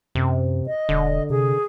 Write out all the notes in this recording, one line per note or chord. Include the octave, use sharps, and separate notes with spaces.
F#2 C3
D#5
E1 D3
C3 G#4